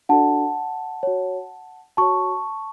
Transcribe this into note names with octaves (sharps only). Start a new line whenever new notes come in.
D4 F#4 A4 D5 F#5 A5
F#4 C#5
F#4 C#5 A5 C#6